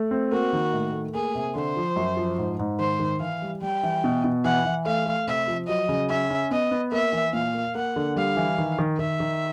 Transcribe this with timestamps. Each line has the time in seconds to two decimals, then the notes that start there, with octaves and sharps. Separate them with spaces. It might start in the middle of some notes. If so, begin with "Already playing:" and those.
Already playing: A3
0.11 C4
0.32 A#3 F#4
0.53 D#3
0.73 A2
0.93 A3
1.14 A#3 G#4
1.35 C3
1.55 D3 C5
1.76 F3
1.96 F#2
2.17 F3
2.38 G#2
2.59 G#2
2.79 D#3 C5
3.00 D#3
3.20 E3 F5
3.42 G3
3.62 G3 G5
3.83 E3
4.04 B2
4.24 B2
4.45 E3 F#5
4.65 E3
4.86 A3 F5
5.06 A3
5.27 C3 E5
5.48 F3
5.68 F#3 D#5
5.89 C#3
6.09 C#4 E5
6.30 C#4
6.51 B3 D#5
6.71 B3
6.92 A#3 E5
7.13 E3
7.33 A#2 F5
7.54 A#3
7.75 A#3 F#5
7.96 D3
8.16 G3 F5
8.37 E3
8.58 D#3
8.79 D#3
8.99 D#3 E5
9.20 D#3